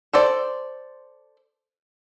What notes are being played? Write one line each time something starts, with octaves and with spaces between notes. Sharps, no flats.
A4 C5 D5